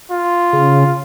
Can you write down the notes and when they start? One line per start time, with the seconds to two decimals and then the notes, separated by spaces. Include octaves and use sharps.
0.11 F4
0.53 C#3